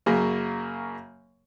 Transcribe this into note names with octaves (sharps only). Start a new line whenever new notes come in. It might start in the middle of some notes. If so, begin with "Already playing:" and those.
F#2 C#3 A#3